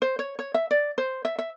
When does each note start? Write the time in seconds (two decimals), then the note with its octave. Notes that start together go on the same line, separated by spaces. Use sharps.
0.02 C5
0.19 C#5
0.39 C#5
0.54 E5
0.71 D5
0.98 C5
1.25 E5
1.38 E5